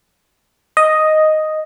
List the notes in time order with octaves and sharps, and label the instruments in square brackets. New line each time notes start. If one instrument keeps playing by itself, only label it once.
[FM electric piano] D#5